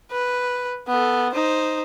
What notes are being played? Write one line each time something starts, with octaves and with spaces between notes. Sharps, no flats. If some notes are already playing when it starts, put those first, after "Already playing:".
B4
B3 A4
D#4 C5